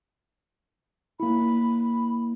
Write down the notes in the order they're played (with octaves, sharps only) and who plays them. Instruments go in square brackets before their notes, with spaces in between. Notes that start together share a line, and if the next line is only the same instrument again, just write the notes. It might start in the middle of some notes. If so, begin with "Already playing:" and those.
[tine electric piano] A#3 E4 [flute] B5